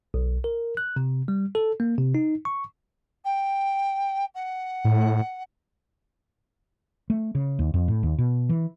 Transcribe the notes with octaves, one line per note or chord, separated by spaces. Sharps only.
B1
A#4
F#6
C3
G3
A4
A#3
C3
D#4
C#6
G5
F#5
A2
A3
C#3
D#2
F2
A2
D#2
B2
E3